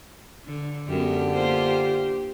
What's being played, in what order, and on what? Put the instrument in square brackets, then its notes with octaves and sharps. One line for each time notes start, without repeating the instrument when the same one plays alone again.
[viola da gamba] D3
[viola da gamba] F#2 G#3 B3 [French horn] D3 [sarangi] G4
[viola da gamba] A#3 F4 C5